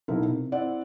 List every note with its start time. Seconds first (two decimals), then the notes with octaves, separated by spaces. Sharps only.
0.08 B1 B2 F#3 D#4 E4 A#4
0.24 C3
0.52 C4 E4 D5 F#5